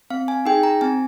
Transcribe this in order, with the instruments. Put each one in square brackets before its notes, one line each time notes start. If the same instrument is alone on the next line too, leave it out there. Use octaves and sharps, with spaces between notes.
[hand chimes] C4 F5
G#5
D#4 G#4 G5
A#5
C4 G#5